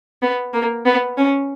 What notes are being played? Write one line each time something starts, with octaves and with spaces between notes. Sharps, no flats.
B3
A#3
B3
C#4